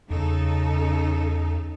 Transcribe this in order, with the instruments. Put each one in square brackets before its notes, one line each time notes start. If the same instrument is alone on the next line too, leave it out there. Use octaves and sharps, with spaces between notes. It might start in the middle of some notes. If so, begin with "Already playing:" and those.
[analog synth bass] E2 [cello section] C#3 D#4 A4